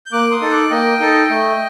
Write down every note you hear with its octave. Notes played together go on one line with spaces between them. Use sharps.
G6
A#3 D6 F#6
C6 D#6
D#4 A4
D6 F#6
A#3 D#5 G5
D#4 A4
A3